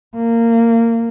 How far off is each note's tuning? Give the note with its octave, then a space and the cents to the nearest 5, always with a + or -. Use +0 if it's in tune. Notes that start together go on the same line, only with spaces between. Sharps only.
A#3 -20